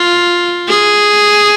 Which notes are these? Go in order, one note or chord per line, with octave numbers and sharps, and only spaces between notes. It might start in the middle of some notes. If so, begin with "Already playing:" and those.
Already playing: F4
G#4